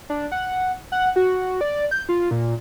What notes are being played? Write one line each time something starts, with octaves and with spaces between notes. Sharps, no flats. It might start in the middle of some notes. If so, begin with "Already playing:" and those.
D4
F#5
F#5
F#4
D5
G6
F4
A#2